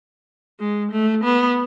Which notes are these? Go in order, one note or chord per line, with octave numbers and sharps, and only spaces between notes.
G#3
A3
B3